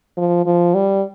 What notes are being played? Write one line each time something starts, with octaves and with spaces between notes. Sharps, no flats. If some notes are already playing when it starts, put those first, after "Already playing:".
F3
F3
G3